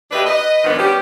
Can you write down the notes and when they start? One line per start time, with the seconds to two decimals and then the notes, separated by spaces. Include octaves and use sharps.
0.11 D2 D4 G4 B4 D#5 E5
0.26 B4 D#5
0.64 G#2 D#3 F3 B3 D4
0.79 G3 B3 C#4 G4